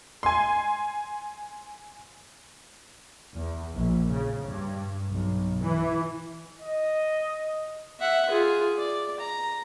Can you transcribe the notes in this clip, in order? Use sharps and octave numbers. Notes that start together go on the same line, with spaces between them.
G#5 C6
E2
A#1
C#3
G2
B1
E3
D#5
E5 F#5
F4 G#4
D5
A#5